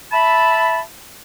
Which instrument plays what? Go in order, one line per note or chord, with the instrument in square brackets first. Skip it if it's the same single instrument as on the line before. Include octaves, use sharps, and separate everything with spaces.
[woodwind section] E5 A5 B5